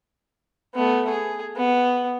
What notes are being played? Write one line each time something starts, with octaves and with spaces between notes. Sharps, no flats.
A3 B3
G#4
B3